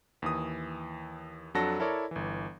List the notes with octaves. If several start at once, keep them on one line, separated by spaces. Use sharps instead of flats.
D#2 E3 D#6
F2 F#3 D4 F#4 A4 A#6
E4 A4 A#4 C#5 D5
G1 E3